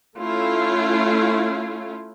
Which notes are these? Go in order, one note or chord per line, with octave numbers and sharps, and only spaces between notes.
A3 C#4 E4 F4